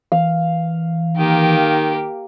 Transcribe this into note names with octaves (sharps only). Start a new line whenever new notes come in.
E3 F5
D#3 A#3 G4